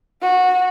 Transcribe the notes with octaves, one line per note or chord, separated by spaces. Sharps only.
F#4